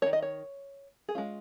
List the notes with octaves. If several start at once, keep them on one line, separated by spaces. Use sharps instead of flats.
D#3 C#4 C#5
D#5
C#5
G#4
G#3 C#4 F4